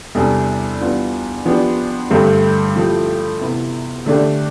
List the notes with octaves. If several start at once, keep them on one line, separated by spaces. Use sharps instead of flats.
E2 C3 G3 D4 A4
E3 G3 B3 D4 F4
F3 B3 D4 G4
G2 D3 A3 C4 G4
F3 A3 E4 G4
C3 E3 B3 E4
D3 A3 D4 G4